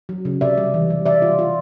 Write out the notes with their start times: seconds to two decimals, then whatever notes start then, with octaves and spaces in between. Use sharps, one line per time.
0.09 F#3
0.25 C#3
0.41 C3 D5 E5
0.58 G3
0.74 E3
0.90 G3
1.06 G3 D5 E5
1.22 F4
1.39 F4